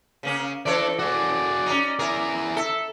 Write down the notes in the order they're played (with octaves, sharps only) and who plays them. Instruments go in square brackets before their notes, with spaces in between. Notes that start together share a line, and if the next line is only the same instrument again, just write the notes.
[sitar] C#3 A#3 C#4
[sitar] E3 A4 C#5 [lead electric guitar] D4 D5
[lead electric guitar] F#4 G#4 [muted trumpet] D5
[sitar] C#4 D#4
[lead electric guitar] E4 G#4 [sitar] A#4
[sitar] A4 [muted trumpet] E5